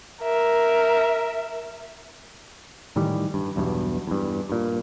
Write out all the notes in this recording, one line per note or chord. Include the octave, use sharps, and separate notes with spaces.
A#4 E5
A2 D#3 E3 G3
G2
B1 E2 G2 B2
E2 G2
G2 A#2